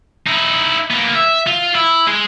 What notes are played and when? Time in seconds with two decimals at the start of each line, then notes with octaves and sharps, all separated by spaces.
0.27 D#4 E4
0.91 A#3 B3
1.15 E5
1.47 F4
1.75 E4
2.08 G#3